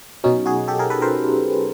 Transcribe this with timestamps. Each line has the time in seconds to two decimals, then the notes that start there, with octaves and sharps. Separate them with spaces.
0.24 B2 F#3 C#4 D#4
0.46 F#4 G#4
0.68 G4 A4
0.79 G#4 A#4
0.90 A4 B4
1.02 A#4 C5